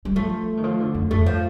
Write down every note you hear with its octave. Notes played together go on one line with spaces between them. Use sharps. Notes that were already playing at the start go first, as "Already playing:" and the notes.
G3
F3 A3
D#3
F3
D3
F2
F2 A3
F3